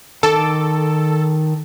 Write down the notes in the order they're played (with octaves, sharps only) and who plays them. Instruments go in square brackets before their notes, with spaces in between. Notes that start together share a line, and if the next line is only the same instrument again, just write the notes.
[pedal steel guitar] D#3 A5 D6 [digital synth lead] A4